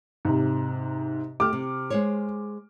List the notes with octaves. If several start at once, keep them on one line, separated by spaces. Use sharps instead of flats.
G#2 C3
A3 G4 D6 F6
C3
G#3 C5 C#5